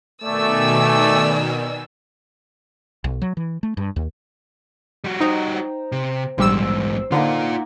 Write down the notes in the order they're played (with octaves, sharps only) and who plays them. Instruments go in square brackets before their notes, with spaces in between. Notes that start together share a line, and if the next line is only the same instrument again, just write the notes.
[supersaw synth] B2 D#3 [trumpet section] A3 D6 [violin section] D5 G#5 E6
[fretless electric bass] B1
F#3
E3
A3
G2
D#2
[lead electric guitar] G3 F#4
[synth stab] D#4 [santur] C5 G5 A#5
[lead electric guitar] C3
[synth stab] A#1 G3 E6 [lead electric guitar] E2 G#2 [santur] C5
[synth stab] D3 [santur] A#3 D#4 F#5 [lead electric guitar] F4 D5